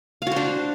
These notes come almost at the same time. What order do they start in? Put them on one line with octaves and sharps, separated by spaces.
F5 F#4 C5 D4